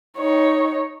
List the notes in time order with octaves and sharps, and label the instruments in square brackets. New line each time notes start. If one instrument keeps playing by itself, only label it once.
[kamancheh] D#4 C#5